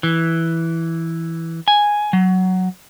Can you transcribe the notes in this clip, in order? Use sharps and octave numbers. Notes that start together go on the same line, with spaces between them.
E3
G#5
F#3